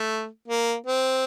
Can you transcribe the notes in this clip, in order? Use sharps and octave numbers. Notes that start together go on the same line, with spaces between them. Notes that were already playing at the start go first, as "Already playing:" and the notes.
Already playing: A3
A#3
C4